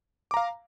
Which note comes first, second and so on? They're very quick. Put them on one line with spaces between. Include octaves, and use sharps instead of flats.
D6 A#5 F5